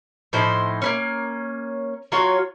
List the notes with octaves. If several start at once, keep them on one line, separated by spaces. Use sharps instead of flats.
A2 F3 D#4 C5
A#3 B3 C#4
F#3 F4 F#4 C#5